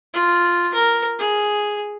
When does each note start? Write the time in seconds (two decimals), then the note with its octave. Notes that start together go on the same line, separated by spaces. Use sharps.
0.13 F4
0.74 A#4
1.19 G#4